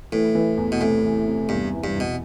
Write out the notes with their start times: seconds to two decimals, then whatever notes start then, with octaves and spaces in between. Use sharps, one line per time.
0.12 A2 E3
0.35 E3
0.57 E2
0.72 B2
0.80 A2 C3
1.03 E3
1.27 C3
1.49 E2 G2
1.73 E3
1.84 G2
1.95 E2
2.00 B2